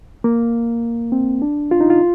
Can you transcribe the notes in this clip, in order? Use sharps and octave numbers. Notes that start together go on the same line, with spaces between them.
A#3
C4
D4
F4
D#4
F4